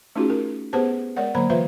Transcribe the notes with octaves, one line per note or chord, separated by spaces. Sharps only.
A3 C#4 D#4 F4 F#4 G#4
A#4
B3 G4 G#4 B4 C5 A5
G#3 A#4 C#5 D5 F#5
D3 F#3 A#3 C5 A#5 B5
E3 F4 B4 C5 E5 F5